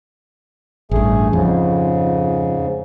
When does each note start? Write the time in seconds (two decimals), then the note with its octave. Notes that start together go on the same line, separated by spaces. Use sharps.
0.91 A1 G2 A3 G#4
1.33 F2 G#2 C#3